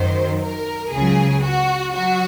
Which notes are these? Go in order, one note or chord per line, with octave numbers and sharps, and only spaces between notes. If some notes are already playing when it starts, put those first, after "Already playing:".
Already playing: F#2 D#3 F#3 C5
A#4
C#2 C#3 F#3 G#4
F#4
F#3 F#4